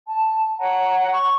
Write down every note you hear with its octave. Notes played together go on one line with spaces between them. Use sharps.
A5
C#5 F#5 A#5
C#6